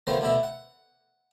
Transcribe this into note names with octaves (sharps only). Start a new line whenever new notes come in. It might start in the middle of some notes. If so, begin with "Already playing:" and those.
D3 D#3 F3 A3 B3 C5
D2 B2 D3 E3 E4 E5
F#5